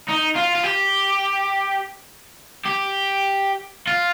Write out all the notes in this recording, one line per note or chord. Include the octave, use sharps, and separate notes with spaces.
D#4
F4
F4
G4
G4
F4